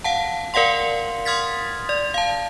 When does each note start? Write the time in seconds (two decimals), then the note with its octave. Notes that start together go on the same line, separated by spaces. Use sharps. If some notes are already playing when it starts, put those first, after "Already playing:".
0.04 F5 F#5 A5
0.54 A#4 D5 F5 F#5 C6
1.25 C6 D#6 F6 G#6 A6 B6
1.89 D5
2.14 F5 A5